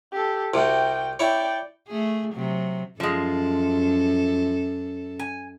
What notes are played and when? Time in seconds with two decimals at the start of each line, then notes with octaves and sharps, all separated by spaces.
0.12 G4 A4
0.54 C2 C3 F#4 G5
1.19 E4 C#5 D5 G5
1.88 A3 G#4
2.33 C3 F#3
3.00 F#2 F3 G#3 A4
5.19 G#5